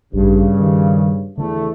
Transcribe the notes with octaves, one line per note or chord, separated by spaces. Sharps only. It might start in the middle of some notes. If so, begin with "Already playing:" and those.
A1 G2 C#3
D#3
E2 D3 A3